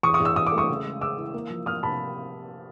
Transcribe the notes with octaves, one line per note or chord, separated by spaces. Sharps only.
E2 C#6 D#6
C#6 D#6
E2 E6
E2 D#6
D6
A3
C#6 D#6
C#3
G#3
C#3 D6 E6
E3
A#3
F3
A#3 D#6 F6
C3 A5 B5